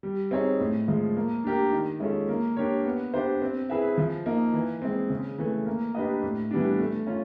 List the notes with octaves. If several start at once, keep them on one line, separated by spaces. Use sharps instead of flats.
G3
C4 D#4 G#4 C#5
A2
F3 G#3
A#3
D4 G4 A#4
D#3
G#3 C#4 F4 A4
A#3
D4 G4 A#4 C#5
B3
D4 G4 C5
C4
E4 G#4 B4 E5
F3
A#3 D#4
E3
G#3 C4
C#3
E3 A3
A#3
D4 G4 B4 D#5
A2
E3 G3 B3 D4
A3
C#4 F4